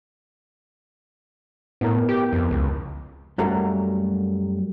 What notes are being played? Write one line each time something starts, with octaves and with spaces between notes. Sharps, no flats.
A2 B3 E4 A#4
G4
F2
C#2
F#2 F#3 G3 A3 A#3